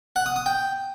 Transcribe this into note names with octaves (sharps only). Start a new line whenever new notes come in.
F#5
D#6
D#6
G5